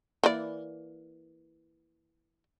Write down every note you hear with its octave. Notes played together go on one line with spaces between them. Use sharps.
E3 A#3 D5